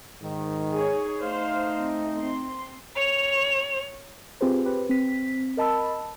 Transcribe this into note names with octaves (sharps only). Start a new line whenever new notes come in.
G#2 D#3
D#4 G#4 C#5
A3 D#4 C5 F5
C4
C4 C6
C#5 F7
C4 F4 G4 G#4 B4 C5
G4 B4 C5
C4 B6
A#4 D#5 A5 B5 E6